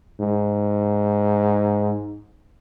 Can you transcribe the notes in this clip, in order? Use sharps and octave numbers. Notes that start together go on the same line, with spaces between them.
G#2